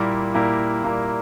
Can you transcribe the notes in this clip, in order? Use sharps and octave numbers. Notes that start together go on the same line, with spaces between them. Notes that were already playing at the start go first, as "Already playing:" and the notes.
Already playing: A#2 G3 A#3 E4 A#4
A#2 G3 A#3 E4 A#4
A#2 G3 A#3 E4 A#4